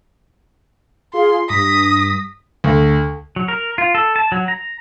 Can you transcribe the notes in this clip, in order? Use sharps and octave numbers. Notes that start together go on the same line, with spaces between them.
F4 G#4 C6
G2 D#6 A#6 B6
D2
F#3
A#4
F4
A4
A5
F#3
A#5